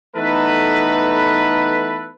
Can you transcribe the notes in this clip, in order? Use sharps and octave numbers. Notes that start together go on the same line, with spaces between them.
E3 A3 B3 D#4 A4 B4